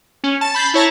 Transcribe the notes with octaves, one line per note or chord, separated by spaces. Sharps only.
C#4
A5 A6
B5 G6 A6 C7
E4 C#5 A5 A#5